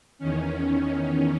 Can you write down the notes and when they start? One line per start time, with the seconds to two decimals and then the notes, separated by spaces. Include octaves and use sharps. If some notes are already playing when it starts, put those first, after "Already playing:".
0.19 E2 D#3 C#4